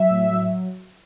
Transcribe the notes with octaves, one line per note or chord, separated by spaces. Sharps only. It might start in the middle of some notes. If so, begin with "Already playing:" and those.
Already playing: F#3 E5
A2
F#3